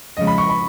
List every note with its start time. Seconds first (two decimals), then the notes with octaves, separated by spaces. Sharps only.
0.17 F2 C#3 G#3 D#5
0.27 B5
0.38 C#6
0.49 B5